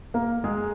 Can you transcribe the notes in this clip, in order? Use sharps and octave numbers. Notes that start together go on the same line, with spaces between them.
A#3 A#4
G#3 G#4